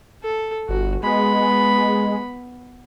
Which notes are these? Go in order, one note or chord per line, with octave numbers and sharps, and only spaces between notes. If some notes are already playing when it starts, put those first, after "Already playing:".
A4
G1 F#4
G#3 B3 B5